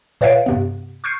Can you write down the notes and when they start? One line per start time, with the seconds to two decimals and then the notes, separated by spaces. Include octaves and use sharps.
0.21 A#2 B4 C#5 E5 F5 D7
0.46 G2 C3 B3
1.04 C#6 F6 G6 C7 C#7